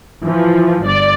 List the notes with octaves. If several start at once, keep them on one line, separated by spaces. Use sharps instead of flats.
E3 F3
G1 D5